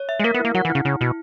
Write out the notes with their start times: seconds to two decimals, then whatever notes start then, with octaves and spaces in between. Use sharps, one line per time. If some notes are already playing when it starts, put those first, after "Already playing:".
Already playing: C#5
0.09 E5
0.19 G#3
0.24 A#3 A#4
0.34 B3
0.40 E4
0.45 A#3
0.55 F#3 F#5
0.65 E3
0.70 E4
0.75 C#3
0.85 C#3 E4
1.01 B2 E4